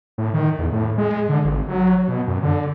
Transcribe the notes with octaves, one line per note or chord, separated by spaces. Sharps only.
A2
D#3
E2
A2
G#3
D3
G#1
F#3
B2
F#2
D3